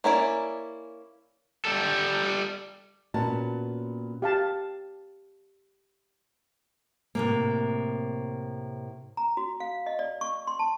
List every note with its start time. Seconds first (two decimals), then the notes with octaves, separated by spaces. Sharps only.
0.04 A#3 C#4 E4 D5
1.65 G3 A4
3.14 A#2 B3 C#4 F#4 A5
4.22 G4 F5 A5
7.15 A2 C3 A#3
9.17 A#5
9.37 F#4
9.60 F5
9.86 D#5
9.99 D5
10.21 C#6
10.47 C6
10.59 A5